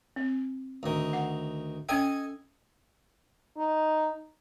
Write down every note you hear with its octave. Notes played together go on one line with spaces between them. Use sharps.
C4
D2 D#3
F#5
C#4 A4 D#5 G5 G#5
D#4